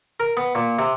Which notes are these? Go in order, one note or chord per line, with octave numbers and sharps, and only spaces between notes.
A#4
B3
A#2
C3